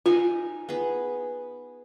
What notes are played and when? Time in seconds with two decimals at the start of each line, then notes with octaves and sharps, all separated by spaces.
0.06 D#4 F4 G#5
0.69 B3 G#4